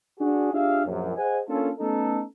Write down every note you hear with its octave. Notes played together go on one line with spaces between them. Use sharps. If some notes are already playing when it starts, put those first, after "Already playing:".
D4 F#4 G#4
D4 F4 G4 G#4 E5 F5
A#1 F#2
G#4 C5 D#5 F#5 G#5
A#3 C#4 D4 F4 A4
A3 B3 C#4 D#4 A4